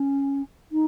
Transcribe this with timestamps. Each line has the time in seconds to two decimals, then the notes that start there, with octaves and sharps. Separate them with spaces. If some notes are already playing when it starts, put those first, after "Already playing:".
Already playing: C#4
0.72 D#4